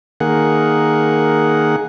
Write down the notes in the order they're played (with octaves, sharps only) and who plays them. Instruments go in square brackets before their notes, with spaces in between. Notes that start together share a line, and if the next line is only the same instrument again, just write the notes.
[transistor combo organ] D#3 A#3 G#4 F#5